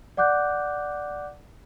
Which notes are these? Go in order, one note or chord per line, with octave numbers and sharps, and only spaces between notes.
D5 F#5 D6 F#6 G6